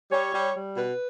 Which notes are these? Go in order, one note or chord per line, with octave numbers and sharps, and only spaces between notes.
G3 C#5
G3
G3
B2 B4